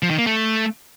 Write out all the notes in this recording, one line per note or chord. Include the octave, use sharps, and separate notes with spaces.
F3
D#3
A#3
A3